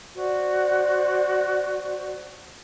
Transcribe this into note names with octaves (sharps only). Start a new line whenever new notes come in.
F#4 C5 D5